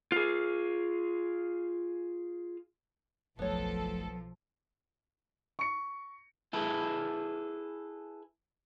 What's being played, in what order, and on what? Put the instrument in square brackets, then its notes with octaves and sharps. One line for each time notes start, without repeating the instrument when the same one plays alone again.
[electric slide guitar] F4 G#4
[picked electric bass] F#1 F#3 A3 [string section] B1 A4 [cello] F3 [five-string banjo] B3 C#5
[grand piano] C#6 C#7
[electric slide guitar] E4 G#4 A4 B4